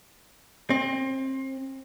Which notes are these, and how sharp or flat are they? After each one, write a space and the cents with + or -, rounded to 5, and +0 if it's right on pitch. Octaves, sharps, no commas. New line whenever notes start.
C4 +30